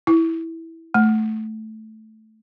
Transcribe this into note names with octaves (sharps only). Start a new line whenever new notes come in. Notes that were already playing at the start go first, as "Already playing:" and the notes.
E4
A3